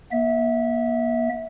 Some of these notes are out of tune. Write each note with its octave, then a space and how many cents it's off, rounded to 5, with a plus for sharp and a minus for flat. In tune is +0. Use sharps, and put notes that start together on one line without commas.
A#3 +40 E5 -20